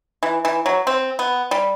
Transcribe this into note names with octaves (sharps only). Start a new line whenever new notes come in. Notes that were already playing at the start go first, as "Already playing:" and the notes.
E3
E3
F#3
C4
B3
G3